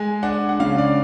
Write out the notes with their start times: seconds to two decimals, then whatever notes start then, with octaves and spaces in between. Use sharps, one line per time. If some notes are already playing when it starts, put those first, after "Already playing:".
Already playing: G#3 G#5
0.23 D4 F#5
0.49 F#5
0.60 C#3 F5
0.78 D5